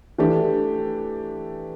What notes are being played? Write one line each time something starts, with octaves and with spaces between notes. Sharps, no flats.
E3 A3 D4 G4